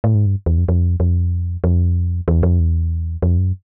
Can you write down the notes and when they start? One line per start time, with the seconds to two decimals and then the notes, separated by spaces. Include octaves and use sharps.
0.04 A2
0.15 G#2
0.26 G2
0.46 E2
0.58 F2
0.69 F2
1.00 F2
1.64 F2
2.28 E2
2.43 F2
2.60 E2
3.22 F2
3.38 F#2